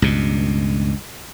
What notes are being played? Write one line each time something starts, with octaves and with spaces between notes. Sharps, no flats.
C#2 G2 B2